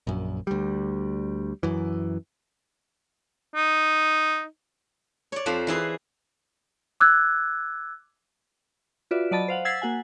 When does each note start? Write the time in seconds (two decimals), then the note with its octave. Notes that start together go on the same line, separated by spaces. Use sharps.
0.07 A#1 F#2
0.47 D2 G3
1.63 F#2 E3
3.56 D#4
5.32 C#5 D5
5.46 F2 F3 C5
5.67 E3 E4 G#4 C6
7.00 D6 E6 F#6 G#6
9.11 F4 F#4 B4 D5 E5
9.31 F#3 D5 D#5 A5 B5 A6
9.48 C5 F5 F#5
9.65 F#5 E6 G#6 A6 B6 C7
9.82 A#3 F#4 F#5 G#5